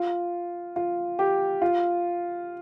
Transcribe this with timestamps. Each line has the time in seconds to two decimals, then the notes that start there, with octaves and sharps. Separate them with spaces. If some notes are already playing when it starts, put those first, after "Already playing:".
Already playing: F4
0.76 F4
1.19 G4
1.62 F4